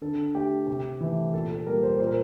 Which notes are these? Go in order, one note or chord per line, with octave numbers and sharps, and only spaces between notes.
D3 A4
A3 G4
C3 G4
E3 A3
A#2 A4
A4
G3 A#3 A#4
C5
A#2 C5
A#4